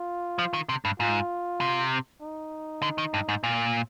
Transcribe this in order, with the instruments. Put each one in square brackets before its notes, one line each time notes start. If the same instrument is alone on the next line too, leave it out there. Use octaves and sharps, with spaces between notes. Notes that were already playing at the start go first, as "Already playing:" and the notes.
Already playing: [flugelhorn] F4
[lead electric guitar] F3
D#3
C3
G2
[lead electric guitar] G#2 [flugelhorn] F4
[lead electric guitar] C3
[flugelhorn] D#4
[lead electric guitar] D3
D#3
G2
G#2
A#2